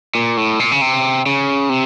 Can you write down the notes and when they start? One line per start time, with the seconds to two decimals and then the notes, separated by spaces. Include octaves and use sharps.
0.15 A#2
0.37 A2
0.60 A#2
0.72 C#3
0.81 C3
1.26 C#3
1.69 C3